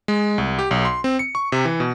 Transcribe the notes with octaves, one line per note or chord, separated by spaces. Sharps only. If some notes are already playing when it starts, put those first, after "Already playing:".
G#3
C2
G4
B1
C6
C4
C#7
C#6
C3
E3
B2